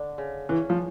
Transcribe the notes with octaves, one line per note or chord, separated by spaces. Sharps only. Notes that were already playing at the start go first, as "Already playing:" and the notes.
Already playing: D3 D4
C#3
E3 C#4
F3